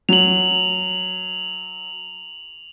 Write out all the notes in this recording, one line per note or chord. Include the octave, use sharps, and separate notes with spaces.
F#3 F7 F#7